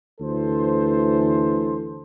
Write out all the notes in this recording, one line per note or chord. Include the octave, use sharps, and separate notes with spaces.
D2 E3 A4 C5